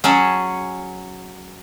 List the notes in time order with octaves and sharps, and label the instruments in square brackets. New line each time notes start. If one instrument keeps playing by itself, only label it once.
[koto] F#3 C#4 G#4 A5